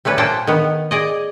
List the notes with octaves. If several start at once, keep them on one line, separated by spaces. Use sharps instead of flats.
G3 A3 C#4 B4
A#2 A#3 C5 F#5 G5 A5
D#3 B3
G#4 D5 D#5